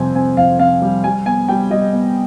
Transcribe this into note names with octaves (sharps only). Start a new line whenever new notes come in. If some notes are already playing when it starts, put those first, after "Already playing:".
Already playing: F2 C3 G3 C4 G#5
C4 G#5
F2 F5
C4 F5
G3
G3 G#5
B3 G#5
G3 G5
G3 D#5
B3